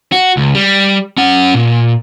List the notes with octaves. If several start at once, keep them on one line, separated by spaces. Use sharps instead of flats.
F#4
C#2
G3
C#4 F#5
A#2